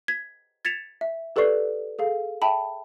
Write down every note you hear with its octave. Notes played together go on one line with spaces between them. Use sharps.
G#6 B6
G#6 A6 B6 C#7 E7 F7
E5
G4 A4 B4 D5 C#6 C7
G#4 A4 F5
E5 G5 A5 B5